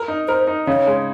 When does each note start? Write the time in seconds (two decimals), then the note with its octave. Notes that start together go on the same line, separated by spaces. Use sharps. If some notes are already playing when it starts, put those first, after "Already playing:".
Already playing: A#4
0.08 D#4
0.28 A#4 C5
0.47 D#4
0.67 C#3 C#5
0.87 G#3